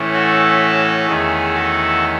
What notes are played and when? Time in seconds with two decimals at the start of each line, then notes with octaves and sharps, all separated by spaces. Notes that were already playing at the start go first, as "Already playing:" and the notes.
Already playing: A2 E3 A3 C#4
0.12 F#4 A4
1.07 E2 D#3 A3 C#4 G#4
1.54 F#4 A4